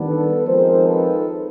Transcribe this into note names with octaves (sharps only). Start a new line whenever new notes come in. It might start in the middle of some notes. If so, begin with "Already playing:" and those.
Already playing: D#3 G3 B3 D4
A4 B4
F3 G#3 C4 D#4 A#4 C5
A4 B4